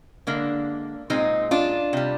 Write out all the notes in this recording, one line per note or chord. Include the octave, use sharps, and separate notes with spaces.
D3 G#3 A#3 D4
A#2 G#3 C4 D#4
D4 F4
C3 G3